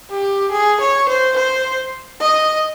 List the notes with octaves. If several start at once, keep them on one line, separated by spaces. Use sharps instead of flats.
G4
G#4
C#5
C5
C5
D#5